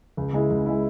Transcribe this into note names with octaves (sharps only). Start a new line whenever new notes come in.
C#2
C#3 G#3 E4
C#2
C#3 G#3 E4